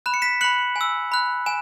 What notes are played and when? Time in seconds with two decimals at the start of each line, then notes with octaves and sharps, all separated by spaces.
0.06 B5 F#6 E7
0.14 C#7
0.22 B6 E7
0.41 B5 F#6 C#7 F#7
0.76 G#5
0.81 E6
1.12 B5 F#6
1.46 G#5 E7